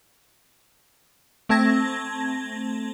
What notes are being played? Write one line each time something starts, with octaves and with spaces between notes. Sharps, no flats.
A3 C4 A5 G#6 A#6